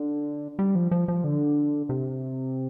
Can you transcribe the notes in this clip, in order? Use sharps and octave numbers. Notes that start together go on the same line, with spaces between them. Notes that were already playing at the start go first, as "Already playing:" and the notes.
Already playing: D3
G3
F3
F3
F3
D3
C3